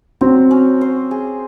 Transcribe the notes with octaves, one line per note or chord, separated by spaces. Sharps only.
F#3 C4
C#4
C5
G#4